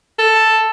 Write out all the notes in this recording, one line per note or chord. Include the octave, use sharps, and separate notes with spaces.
A4